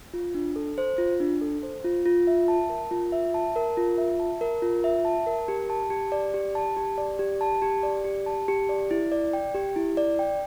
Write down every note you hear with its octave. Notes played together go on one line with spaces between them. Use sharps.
F4
D4
A4
C5
F4
D4
A4
C5
F4
F4
E5
A5
A#4
F4
E5
A5
A#4
F4
E5
A5
A#4
F4
E5
A5
A#4
G4
A5
G4
D5
G4
A5
G4
D5
G4
A5
G4
D5
G4
A5
G4
D5
E4
D5
G5
G4
E4
D5
G5